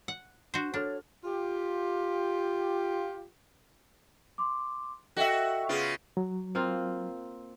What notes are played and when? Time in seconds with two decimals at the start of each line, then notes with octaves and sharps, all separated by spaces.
0.08 F#5
0.54 D4 F#4 C5
0.74 D4 A4 C#5 F6 A6
1.24 F4 G4
4.38 C6 D6
5.16 F#4 A4 D#5 E5 G5
5.69 C#3 B3 F4 G#4 C#6 D7
6.17 F#3
6.55 A#3 C4 F4